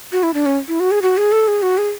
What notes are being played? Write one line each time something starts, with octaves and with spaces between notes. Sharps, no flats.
F#4
E4
D4
C#4
E4
F#4
G#4
F#4
G#4
A4
G#4
F#4
G#4